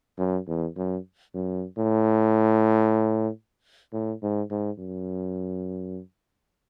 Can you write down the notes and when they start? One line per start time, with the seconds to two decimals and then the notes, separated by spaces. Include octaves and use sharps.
0.18 F#2
0.47 E2
0.77 F#2
1.34 F#2
1.78 A2
3.93 A2
4.22 G#2
4.51 G#2
4.79 F#2